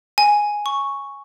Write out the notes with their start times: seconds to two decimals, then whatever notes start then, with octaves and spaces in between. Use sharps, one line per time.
0.18 G#5
0.66 C#6